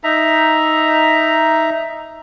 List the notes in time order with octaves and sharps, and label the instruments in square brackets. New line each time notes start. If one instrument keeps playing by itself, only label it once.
[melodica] D#4 E5 A#5